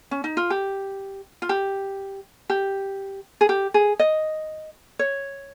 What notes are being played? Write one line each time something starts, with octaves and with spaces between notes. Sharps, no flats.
C#4
D#4
F4
G4
F4
G4
G4
G#4
G4
G#4
D#5
C#5